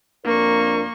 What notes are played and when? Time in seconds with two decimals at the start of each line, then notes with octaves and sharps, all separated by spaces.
0.25 F2 A#3 D4 A#4 C#6